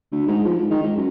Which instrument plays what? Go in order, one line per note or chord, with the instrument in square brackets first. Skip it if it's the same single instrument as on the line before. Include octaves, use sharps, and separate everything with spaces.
[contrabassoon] D2
G#2
F3
G#2
D#3
G#2
F#2